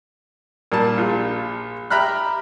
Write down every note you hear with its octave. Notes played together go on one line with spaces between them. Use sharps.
A#2 G3 A5
A#1 F4
G4 E5 A#5 B5 F6 F#6